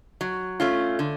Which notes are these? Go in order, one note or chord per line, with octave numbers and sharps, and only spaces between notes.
F#3
A3 C#4 F4
D3